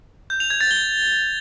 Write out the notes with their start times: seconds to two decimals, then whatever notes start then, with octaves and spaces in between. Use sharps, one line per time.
0.30 G6
0.40 F7
0.50 G#6
0.61 A6
0.71 G7